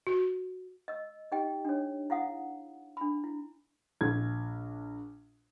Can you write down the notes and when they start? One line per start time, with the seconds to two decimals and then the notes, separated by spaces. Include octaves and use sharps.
0.07 F#4
0.88 D#5 E6
1.32 D#4 G4 D#5 G5
1.65 D4 C#5
2.10 E4 F5 F#5 D#6
2.97 D4 B5
3.24 E4
4.01 A#1 G#6